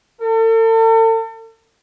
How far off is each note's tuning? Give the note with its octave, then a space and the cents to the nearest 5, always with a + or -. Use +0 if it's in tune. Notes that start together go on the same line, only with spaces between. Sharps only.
A4 +40